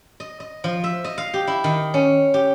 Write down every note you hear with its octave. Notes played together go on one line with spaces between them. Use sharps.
D#5
D#5
F3
E5
D#5
F5
G4
E4
D#3
C#4
G4